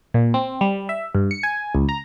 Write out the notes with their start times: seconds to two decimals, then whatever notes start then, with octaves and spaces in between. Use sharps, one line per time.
0.14 A#2
0.34 C4
0.61 G3
0.89 E5
1.15 G2
1.31 C#7
1.43 G#5
1.75 C#2
1.89 A#5